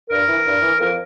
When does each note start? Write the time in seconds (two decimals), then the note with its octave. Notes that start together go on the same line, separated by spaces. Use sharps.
0.10 G2 A#4
0.28 E3
0.45 G2
0.61 E3
0.80 F2 A#4